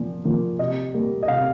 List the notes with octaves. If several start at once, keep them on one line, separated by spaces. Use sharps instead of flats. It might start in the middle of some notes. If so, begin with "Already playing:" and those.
Already playing: A#2 F3
F3 A#3
C3 D#5
G3 A#3
D#5
C3 F5